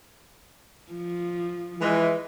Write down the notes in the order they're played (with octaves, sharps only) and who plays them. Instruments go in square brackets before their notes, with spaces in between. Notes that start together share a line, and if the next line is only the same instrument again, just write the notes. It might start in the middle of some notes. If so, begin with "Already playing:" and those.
[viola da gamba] F3
[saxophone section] E3 G#3